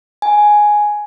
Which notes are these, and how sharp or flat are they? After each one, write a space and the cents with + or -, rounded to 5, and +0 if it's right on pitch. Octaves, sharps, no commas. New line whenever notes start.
G#5 +5